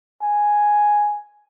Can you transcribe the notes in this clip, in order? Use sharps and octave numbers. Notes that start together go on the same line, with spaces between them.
G#5